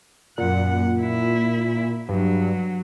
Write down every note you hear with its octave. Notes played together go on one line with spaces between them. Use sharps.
F#2 A#2 F#5
E4
G2 F#3